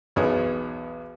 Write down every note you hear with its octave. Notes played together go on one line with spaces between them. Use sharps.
B1 E2 B3 D#4 G#4 C#5